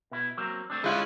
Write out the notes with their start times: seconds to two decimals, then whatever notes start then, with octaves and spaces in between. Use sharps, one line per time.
0.11 B2 E4
0.37 F#3 A#3 C4
0.70 A3 C4 D4
0.84 D#3 G3 G#3 C#4 E4 F4 F#5